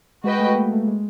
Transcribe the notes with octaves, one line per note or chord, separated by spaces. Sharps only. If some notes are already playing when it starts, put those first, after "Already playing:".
G#3 F#4 B4 D#5 G5
A3
A#3
A3
G#3